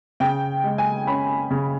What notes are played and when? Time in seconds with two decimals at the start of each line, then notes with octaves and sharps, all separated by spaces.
0.20 C#3 G5
0.64 G#3
0.78 G#5
1.07 C#4 B5
1.50 C#3